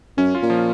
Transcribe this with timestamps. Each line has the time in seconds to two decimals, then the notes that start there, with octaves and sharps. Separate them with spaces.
0.17 F#2 C#4
0.35 F4
0.42 A#2
0.50 F3